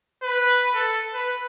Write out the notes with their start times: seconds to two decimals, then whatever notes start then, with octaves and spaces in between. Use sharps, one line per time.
0.23 B4
0.75 A4
1.14 B4